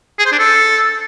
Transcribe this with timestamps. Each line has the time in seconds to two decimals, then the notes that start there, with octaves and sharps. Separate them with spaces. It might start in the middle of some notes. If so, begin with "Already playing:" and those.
0.19 G#4
0.26 C5
0.32 D4
0.39 A4